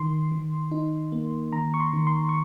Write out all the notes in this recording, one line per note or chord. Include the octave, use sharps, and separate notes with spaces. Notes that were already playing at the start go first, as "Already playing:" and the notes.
Already playing: D#3 C6
D#3
D#4
A#3
D#3 A#5
C#6
C6
D#3
C6
C#6